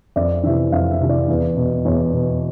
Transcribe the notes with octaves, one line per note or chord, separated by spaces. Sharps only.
F2 D5
C3 E3 E5
F2 F5
E5
C3 E3
D5
E2
B2
E2 C#5
B2